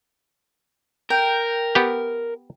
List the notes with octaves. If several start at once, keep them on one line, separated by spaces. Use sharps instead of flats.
A#4 G5
B3 G4